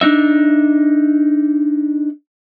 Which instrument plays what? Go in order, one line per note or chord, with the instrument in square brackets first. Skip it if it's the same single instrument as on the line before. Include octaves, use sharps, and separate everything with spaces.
[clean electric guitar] D4 D#4 E5